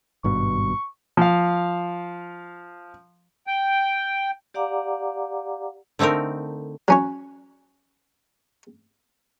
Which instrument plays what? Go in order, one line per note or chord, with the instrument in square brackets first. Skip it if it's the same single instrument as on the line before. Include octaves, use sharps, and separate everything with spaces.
[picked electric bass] G#1 G2 B2 [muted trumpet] C#6
[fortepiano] F3 F5
[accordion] G5
[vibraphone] G4 D5 F5 F#5 A#5 D6
[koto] D3 A3 C4 D#4 A#4
[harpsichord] F#3 C#4 C#5